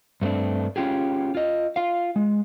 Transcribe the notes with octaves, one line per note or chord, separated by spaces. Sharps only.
G2 A3 C4 D4
C#4 F4 G4 G#4
F4 D#5
F4 F5
G#3